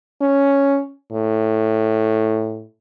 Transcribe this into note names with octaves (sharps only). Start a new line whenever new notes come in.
C#4
A2